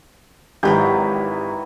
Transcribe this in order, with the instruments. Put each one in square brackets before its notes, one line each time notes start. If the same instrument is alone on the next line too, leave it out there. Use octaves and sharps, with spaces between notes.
[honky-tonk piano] G#1 G4 G6 [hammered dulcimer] D#3 E3 F#3